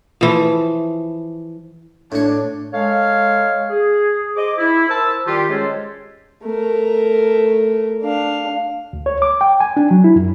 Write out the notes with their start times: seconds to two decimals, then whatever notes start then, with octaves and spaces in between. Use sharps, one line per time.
0.21 E3 F3
2.12 A2 D4 C#5
2.72 G#3 A4 C#5 F5
3.70 G#4
4.36 G#4 C5 D#5 D6
4.58 E4
4.89 A#4 C5 A5 E6
5.27 D#3 G3 F4 G4
5.50 G#3 C#4 G#4 A4 C5 C#5
6.43 A3 A#4
8.02 D4 F5
8.93 D2
9.06 C#5
9.22 D6
9.41 G5
9.60 G#5
9.77 D4
9.91 F#3
10.04 E4
10.16 F#2